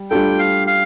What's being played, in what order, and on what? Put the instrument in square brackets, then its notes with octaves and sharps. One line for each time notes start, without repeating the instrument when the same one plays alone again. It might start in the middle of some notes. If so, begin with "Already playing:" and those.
Already playing: [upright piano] G3
[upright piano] G3 D4 F4 A4 [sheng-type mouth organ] G5
[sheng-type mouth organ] F5
F5